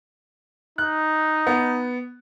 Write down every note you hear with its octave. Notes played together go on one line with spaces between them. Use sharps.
D#4 F#6
B3